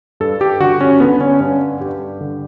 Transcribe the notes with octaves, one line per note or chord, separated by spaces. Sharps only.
G2 A4
G4
D3 F#4
C#4
D3 B3
C#4
G2 C#4
G2 G4
D3